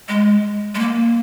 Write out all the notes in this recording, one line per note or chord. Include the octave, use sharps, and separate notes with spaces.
G#3
G#3
A#3